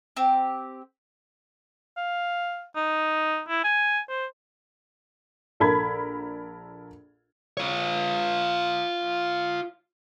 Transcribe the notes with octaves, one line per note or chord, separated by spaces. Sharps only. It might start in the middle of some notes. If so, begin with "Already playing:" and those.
C4 G4
F5
D#4
E4
G#5
C5
A#1 A4 A#4 B5 G#6
F4 C#5